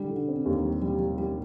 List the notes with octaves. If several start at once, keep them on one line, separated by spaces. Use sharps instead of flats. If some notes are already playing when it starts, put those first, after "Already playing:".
Already playing: D3 G3
D3
C4
D#2
G3
G3
G3
G3